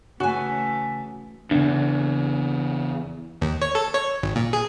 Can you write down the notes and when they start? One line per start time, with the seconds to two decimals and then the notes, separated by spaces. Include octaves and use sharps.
0.20 C#3 E3 A3 F#4 G#5
1.51 E2 C#3 D4
3.41 D#2
3.62 C#5
3.75 A4
3.94 C#5
4.23 G#1
4.36 A#2
4.53 G#4